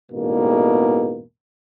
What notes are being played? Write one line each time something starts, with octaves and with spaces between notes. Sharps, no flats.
A1 E2 G#2 B2 A#3